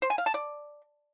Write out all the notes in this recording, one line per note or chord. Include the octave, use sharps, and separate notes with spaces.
C5
G#5
F5
A5
D5